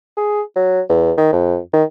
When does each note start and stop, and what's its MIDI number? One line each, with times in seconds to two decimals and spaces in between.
0.17 0.42 68
0.56 0.81 54
0.89 1.12 40
1.18 1.28 51
1.33 1.58 41
1.73 1.84 51